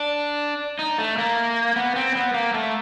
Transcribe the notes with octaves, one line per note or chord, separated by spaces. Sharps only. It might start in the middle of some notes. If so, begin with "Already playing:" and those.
Already playing: D4
D#4
A3
A#3
B3
C4
B3
A#3
A3